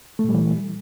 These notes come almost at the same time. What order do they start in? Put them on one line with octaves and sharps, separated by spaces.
A3 A#2 G3 E3